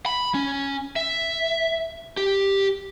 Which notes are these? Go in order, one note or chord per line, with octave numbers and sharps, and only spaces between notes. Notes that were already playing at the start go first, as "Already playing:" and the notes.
B5
C#4
E5
G4